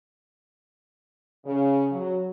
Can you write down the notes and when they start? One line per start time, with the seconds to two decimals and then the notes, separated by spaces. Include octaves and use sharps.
1.45 C#3
1.91 F#3